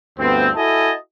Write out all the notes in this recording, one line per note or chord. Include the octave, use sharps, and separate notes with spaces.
D2 G2 B3 C4
E4 F#4 A4 D#5 G#5 A5